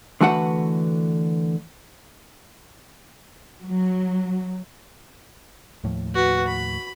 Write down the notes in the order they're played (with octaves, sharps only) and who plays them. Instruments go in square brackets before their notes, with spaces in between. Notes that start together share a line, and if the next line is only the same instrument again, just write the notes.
[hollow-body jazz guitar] D3 E3 A3 F#4 B4 F#5
[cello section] F#3
[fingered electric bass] D#2 A2 F3
[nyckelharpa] F#4 B4
B5